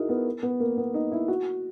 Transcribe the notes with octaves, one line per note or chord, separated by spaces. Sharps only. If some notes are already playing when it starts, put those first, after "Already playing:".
Already playing: D#4 E4 F#4 G#4 A#4
B3
B3
A#3
B3
D#4
E4
F#4